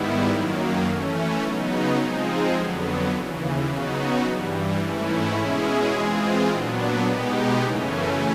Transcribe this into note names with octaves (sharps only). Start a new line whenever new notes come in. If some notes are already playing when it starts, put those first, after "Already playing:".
Already playing: G#2 D#3 G3 B3 E4
F#2 D#3 F#3 A#3
E3 A3 C#4
C#3 F#3 B3 D#4
F3 G#3 C4 D#4 G#4
F2 D3 F#3 B3
D#2 C#3 E3
C#3 F#3 B3 D#4 F#4
G2 E3 G3
G#2 E3 A3 C#4 E4
B2 G#3 C#4 E4 G#4
E3 G#3 C4 F4 G#4
A#2 F#3 B3 D4
B2 G#3 B3 D#4 G4
F#2 C#3 E3 A3 C#4